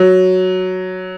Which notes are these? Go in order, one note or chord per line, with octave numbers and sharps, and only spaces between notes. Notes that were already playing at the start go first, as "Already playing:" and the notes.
Already playing: F#3